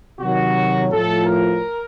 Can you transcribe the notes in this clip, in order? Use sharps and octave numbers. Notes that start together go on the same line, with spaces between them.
C3 D#3 F#3 F#4
A2 F3 A4
A#4